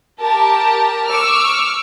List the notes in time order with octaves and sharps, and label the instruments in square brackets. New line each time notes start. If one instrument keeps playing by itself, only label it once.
[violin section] G4 A#4 A5
C#6 D6 E6 F6